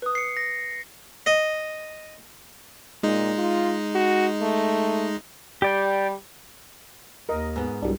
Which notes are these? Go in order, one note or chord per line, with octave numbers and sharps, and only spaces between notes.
B4 D#6
C7 C#7
A#6
D#5
A#2 G#3 D#4
F4
F#4
A3
G3 G4 D5 G5
D#2 A#4 D#5
G#2 B3
C2 F#3 G3 D4